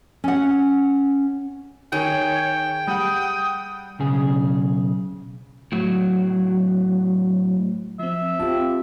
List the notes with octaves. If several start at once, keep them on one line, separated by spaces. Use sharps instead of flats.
C#4 F#5
D#3 G#4 C#5 G5
G3 F#5 D#6
B1 C#3 G#4
A2 F#3
F3 C4 E5
C4 F4 G4 A5